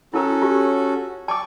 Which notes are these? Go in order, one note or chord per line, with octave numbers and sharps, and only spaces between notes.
C#4 E4 F#4 A4 A#4 A#5
F4 G4
D5 A5 C#6 D6